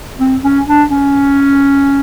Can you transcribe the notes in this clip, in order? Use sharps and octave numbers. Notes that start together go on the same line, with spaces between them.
C4
C#4
D4
C#4